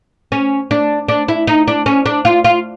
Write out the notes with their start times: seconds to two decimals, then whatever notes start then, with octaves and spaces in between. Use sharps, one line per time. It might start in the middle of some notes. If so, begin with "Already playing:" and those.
0.32 C#4
0.71 D4
1.08 D4
1.28 E4
1.47 D#4
1.68 D4
1.86 C#4
2.06 D4
2.25 F4
2.44 F4